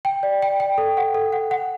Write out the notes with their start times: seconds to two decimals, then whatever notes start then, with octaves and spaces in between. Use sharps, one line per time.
0.05 G5
0.23 D5
0.42 G5
0.60 G5
0.78 A4
0.97 F#5
1.15 A4
1.33 F#5
1.51 F#5